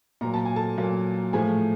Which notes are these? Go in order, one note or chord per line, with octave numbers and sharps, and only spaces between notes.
A#2 F#3 A#3 A#5
A5
G#5
A4 A5
A#2 F#3 A#3
A2 F3 A3 G#4 G#5